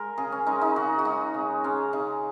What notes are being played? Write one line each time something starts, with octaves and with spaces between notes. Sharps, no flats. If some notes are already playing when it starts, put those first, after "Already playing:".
Already playing: G#3 A#4
C#3 G#4
C#4
G#3 D#4
D#4
C#3 F#4
F#4
G#3 D#4
C#3
G#3 C#4
C#3 D#4